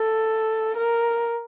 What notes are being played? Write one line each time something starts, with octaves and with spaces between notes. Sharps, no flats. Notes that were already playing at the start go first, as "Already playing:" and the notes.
Already playing: A4
A#4